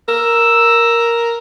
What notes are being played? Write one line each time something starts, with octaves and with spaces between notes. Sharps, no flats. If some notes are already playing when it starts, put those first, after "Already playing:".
A#4 E6